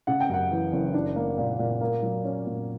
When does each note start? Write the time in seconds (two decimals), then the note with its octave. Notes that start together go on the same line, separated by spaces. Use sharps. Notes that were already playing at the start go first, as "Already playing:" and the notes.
0.07 C#3 F#5
0.20 G5
0.29 F#2 F#5
0.51 E3
0.73 F#1
0.94 D4
1.16 A#3
1.38 A#2
1.59 A#2
1.81 A#3
2.02 F#3
2.24 C#4
2.46 A#2